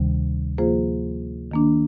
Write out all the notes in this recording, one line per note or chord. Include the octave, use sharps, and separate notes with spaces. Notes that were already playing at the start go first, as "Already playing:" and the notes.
Already playing: D2 C3 D#3 G3
F3 A#3 F4 G#4 C5
D#3 A#3 D4